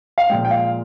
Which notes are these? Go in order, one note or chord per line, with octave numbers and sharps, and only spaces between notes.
F5
A#2 F3 G#3 G5
G5
F5